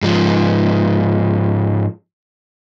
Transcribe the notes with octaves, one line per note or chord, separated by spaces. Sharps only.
G#2 F3